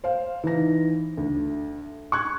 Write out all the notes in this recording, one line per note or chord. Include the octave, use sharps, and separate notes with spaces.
C5 F5
E3 D#4 A#6
D2
C#6 F#6 G#6